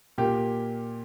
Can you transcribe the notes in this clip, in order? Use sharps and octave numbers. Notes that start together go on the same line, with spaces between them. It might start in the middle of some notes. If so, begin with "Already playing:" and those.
A#2 A#3 G4